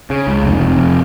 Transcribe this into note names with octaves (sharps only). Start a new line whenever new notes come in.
C#3
C#2
F1
F2
F1